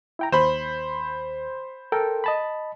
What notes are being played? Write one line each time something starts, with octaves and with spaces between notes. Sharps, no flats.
E4 G5 A#5
D#2 C5 B5
A4 A#4 G5
D#5 A5 B5